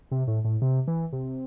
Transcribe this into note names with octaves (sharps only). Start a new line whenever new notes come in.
C3
A2
A2
C3
E3
C3